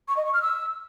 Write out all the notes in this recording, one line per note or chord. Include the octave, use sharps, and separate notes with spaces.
C#6
D#5
C#6
F6
E6